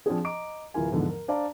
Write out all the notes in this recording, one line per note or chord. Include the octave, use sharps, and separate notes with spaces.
F3 C4 D4 G#4
D#5 A#5 D6 D7
D1 E3 F4 A#4 G#5
E2 G#2 D3 F3 B3
A#4
D4 C5 D5 F5 A5 A#5